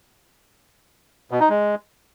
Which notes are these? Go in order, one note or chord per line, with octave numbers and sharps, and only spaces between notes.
B2
D#4
G#3